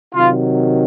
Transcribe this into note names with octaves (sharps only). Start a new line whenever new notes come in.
C3 D#3 F#3 F4